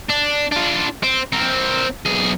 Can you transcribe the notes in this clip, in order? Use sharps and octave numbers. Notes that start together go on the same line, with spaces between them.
D4
D4 F4
C4
C4 A#4
B1 G#4